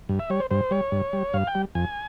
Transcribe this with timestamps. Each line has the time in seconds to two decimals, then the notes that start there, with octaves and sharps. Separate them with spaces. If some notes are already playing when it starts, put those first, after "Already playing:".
0.09 G2
0.19 E5
0.30 G3 C#5
0.40 C5
0.51 G2 C5
0.71 G3 C#5
0.92 G2
1.13 G3
1.33 G2 F5
1.47 G5
1.55 G3
1.75 F2 G#5